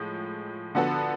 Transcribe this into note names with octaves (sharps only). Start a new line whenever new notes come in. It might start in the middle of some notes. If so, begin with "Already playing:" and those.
Already playing: A2 F3 G#3
D3 F3 B3 F#4 A4